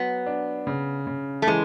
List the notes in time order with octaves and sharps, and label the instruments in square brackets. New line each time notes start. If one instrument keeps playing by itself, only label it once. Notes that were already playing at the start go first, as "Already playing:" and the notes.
Already playing: [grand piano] F#3 [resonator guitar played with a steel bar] B3
[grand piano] D4
C#3
C#3
[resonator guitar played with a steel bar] A3
[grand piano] E3 [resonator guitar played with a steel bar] G#3